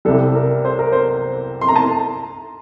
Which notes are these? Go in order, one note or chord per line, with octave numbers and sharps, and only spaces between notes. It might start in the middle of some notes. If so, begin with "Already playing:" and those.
C2 C3 G3 A4
A#4
C5
A#4
C5
C6
A#5
A5